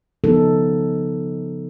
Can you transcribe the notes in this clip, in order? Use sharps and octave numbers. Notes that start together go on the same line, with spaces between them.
C#3 F3 B3 D#4 A4